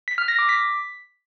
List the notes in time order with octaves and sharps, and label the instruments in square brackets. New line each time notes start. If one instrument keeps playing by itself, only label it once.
[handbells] B6
F6
A#6
D6
B6